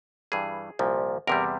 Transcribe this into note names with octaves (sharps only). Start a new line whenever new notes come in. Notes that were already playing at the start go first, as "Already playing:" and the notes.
G2 E3 G3 G#4
C2 A#2 F3
E2 C3 G3 A#4